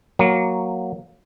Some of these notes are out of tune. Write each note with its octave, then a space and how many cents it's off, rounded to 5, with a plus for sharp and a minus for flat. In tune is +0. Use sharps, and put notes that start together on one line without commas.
F#3 +0 A#3 +0